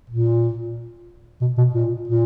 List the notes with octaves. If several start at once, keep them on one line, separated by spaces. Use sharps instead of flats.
A#2
B2
B2
A#2
A#2